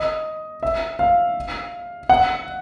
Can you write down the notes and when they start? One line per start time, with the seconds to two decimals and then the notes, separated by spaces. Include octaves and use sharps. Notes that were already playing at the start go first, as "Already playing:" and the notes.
Already playing: D#5
0.63 E5
0.99 F5
2.09 F#5